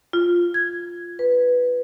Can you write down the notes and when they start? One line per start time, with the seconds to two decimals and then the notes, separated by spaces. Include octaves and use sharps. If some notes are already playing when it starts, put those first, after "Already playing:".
0.13 F4
0.54 G#6
1.19 B4